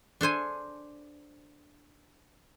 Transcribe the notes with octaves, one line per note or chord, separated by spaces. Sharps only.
D4 A4 C5 G#5